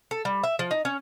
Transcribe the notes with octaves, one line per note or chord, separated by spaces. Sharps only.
A4
G3
E5
F3
D#4
C#4